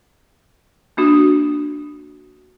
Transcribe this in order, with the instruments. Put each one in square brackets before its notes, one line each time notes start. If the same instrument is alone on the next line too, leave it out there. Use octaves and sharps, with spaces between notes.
[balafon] A#3 D4 F#4